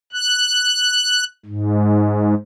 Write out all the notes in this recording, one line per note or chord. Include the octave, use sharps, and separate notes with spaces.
F#6
G#2